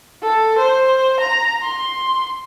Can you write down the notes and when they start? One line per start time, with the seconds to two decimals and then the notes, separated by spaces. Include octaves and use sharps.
0.23 A4
0.58 C5
1.20 A#5
1.63 C6